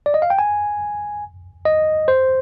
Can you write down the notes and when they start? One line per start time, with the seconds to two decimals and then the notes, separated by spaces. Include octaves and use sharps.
0.06 D5
0.14 D#5
0.22 F5
0.30 G5
0.39 G#5
1.65 D#5
2.08 C5